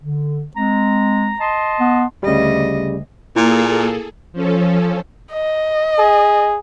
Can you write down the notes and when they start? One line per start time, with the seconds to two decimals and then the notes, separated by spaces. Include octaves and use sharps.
0.02 D3
0.56 G#3 C4 A#5
1.40 D#5 A5 C6
1.80 B3
2.23 D2 C#3 G3 D#5
3.36 A#2 A#3 E4 G#4 A4
4.33 F3 C#4 A4
5.32 D#5
5.99 G#4